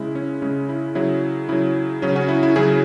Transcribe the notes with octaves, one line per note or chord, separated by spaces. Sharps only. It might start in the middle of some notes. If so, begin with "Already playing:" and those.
Already playing: C#3 G#3 E4
C#4
C#3 G#3 C#4
E4
C#3 F#3 E4
C#3 F#3 E4
C#3 F#3 C#4
C#4 F#4
E4
E4
C#3 F#3 E4 G#4